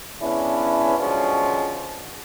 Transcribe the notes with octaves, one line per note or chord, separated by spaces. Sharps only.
C#3 B3 C#4 D4 E4
B2 D3 F3 F#3 G#3 C#4